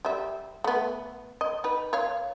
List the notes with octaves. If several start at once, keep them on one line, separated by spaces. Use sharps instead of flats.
G3 E5
A3 B3
D#5
D#4 B4
C#5 F5